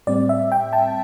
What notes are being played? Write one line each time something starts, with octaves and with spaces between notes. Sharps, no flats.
A2 G3 C4 D5
E5
G5
A5